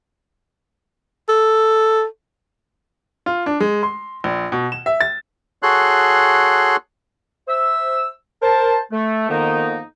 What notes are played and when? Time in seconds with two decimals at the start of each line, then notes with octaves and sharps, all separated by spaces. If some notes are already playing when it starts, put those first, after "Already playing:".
1.29 A4
3.26 F4
3.46 D4
3.60 G#3
3.83 C6
4.24 A#1
4.52 B2
4.72 E7
4.86 E5
5.01 A6
5.63 F#4 G#4 A4 C#5 C6 F#6
7.48 C5 E5 E6
8.42 A#4 C5 A5
8.92 A3
9.29 F2 D#3 A#3 B3 D#4